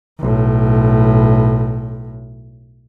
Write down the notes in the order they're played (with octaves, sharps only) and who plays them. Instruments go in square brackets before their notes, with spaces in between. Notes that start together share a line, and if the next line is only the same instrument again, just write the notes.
[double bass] B1 A2